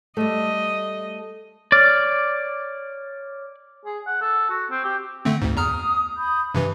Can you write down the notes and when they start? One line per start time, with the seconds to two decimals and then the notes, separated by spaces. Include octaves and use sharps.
0.17 G3 A3 D#5
1.72 C#5 D5 D6 F6
3.86 G#4
4.07 F#5
4.22 A4
4.50 F#4
4.71 C4
4.84 G4
5.25 D3 A3 C4
5.42 D2 G#2
5.57 E2 A#5 D#6 F6
6.15 B5 D#6 G6
6.55 G2 C3 E3 B4